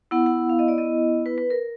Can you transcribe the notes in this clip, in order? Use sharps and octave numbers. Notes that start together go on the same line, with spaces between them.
B3 E4 F#5
F#5
F5
D#5
D5
D#5
B4
B4
A#4